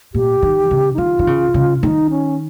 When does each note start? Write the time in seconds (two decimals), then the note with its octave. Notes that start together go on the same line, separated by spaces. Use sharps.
0.14 A#2 G4
0.42 D#3
0.71 C#3
0.94 D#4
0.98 D#3 F4
1.19 D#3
1.27 C#3
1.54 C#3
1.82 D#3 D#4
2.10 C#4